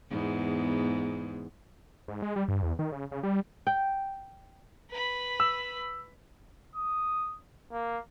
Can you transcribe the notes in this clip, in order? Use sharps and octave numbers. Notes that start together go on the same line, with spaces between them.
E2 G#2 B3
G#2
G#3
G3
G2
E2
D#3
C#3
C#3
G3
G5
B4 B5
E6
D#6
A#3